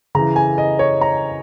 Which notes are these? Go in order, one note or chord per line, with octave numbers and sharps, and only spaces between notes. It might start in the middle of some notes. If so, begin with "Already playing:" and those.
C#3 E3 A#5
G#5
D#5
C#5
A#5